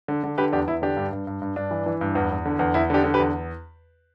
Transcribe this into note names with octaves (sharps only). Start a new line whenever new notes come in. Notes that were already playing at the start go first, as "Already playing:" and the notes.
D3
D3
D3 G4 B4
E2 D4 G4
E2 E4
D3 D4 G4
G2
G2
G2
G2
G2 D4
E3
E3
G2
E2
E2
D3
E2
E2 E4
D3 D4 G4
D3
G4 B4
E2